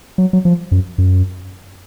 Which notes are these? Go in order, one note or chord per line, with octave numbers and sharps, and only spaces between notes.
F#3
F#3
F3
F#2
F#2